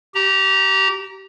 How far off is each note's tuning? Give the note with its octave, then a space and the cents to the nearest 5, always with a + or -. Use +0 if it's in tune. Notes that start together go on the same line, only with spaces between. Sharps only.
G4 -25 A#5 +0